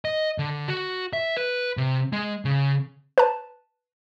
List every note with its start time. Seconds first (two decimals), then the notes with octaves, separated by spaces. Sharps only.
0.05 D#5
0.38 D3
0.68 F#4
1.13 E5
1.37 B4
1.77 C3
2.13 G#3
2.45 C#3
3.18 B4 A5